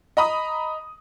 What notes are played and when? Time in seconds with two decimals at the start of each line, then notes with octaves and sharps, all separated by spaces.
0.17 D#5 A#5 B5 D#6